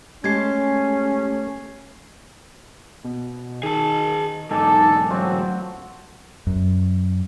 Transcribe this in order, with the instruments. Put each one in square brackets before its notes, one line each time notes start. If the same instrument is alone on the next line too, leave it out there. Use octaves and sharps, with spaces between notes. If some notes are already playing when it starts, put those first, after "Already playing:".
[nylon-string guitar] G#3 G4 A5 [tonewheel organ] A3 [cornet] C#4 [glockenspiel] G#6 C7
[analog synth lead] B2
[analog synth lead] D#3 [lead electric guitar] G#4 A5
[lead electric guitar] E2 G#2 [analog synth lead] D#4 [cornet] A4 [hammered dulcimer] G#5 D6
[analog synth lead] F#3 [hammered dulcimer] A3 F4 F#4 [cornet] C4
[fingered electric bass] F#2